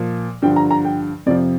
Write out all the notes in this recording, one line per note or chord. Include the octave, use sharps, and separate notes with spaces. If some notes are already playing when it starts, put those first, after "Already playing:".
Already playing: A#2 F3
G2 D3 F3 G5
A#5
A#5
G5
F2 C3 F3 D5